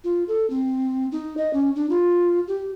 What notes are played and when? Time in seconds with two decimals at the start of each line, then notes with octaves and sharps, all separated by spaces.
0.04 F4
0.28 A4
0.50 C4
1.12 D#4
1.37 D#5
1.53 C#4
1.75 D4
1.89 F4
2.48 G4